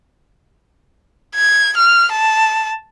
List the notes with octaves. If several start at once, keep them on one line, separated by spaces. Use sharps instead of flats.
G#6
F6
A5